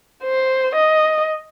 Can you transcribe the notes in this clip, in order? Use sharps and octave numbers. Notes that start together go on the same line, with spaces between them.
C5
D#5